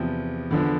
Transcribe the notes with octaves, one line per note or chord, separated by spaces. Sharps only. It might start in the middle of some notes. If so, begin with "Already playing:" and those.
Already playing: E2 C3 F3
E2 D3 F3